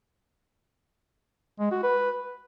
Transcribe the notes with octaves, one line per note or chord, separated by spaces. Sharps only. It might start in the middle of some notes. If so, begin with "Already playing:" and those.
G#3
F#4
B4